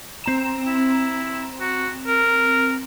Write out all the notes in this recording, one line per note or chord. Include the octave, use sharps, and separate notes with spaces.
C4 A#5 E7
E4
F#4
A#4